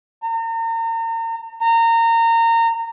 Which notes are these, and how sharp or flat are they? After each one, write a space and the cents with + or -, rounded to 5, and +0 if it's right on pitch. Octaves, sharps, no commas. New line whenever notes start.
A#5 -40
A#5 -25